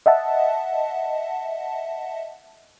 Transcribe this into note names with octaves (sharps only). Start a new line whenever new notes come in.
D#5 E5 F#5 A5